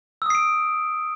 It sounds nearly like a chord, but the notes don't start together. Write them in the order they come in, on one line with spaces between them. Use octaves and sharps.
E6 D#6 C7 D7